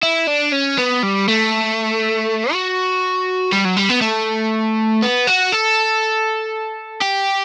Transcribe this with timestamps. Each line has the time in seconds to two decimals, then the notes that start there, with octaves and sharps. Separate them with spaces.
0.03 E4
0.28 D4
0.53 C#4
0.78 B3
1.03 G3
1.28 A3
2.52 F#4
3.53 G3
3.65 F#3
3.77 G3
3.90 B3
4.02 A3
5.02 B3
5.27 F#4
5.52 A4
7.01 G4